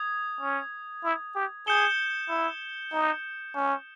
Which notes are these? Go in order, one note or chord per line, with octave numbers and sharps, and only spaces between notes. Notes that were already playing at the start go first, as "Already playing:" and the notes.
Already playing: D#6 G#6
C#4
E4
G4
G#4 G6 C#7 E7 G7
E4
D#4
C#4